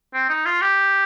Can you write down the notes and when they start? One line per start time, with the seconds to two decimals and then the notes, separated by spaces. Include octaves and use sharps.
0.14 C4
0.29 D#4
0.46 F4
0.61 G4